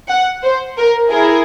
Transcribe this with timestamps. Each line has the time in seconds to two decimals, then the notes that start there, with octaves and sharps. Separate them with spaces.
0.10 F#5
0.44 C5
0.77 A#4
1.11 E4 G#4 A#4